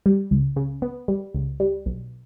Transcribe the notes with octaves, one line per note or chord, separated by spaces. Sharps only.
G3
C#2
C#3
B3
G3
C#2
G3
B1